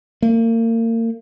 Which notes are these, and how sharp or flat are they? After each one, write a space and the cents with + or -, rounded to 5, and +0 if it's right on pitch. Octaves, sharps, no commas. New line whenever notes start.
A#3 -35